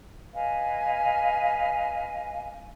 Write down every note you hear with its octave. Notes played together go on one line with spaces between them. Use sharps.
B4 D#5 F5 G#5